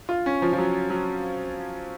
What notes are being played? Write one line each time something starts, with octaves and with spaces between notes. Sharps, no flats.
F4
C#4
F3
F3
F#3
F#3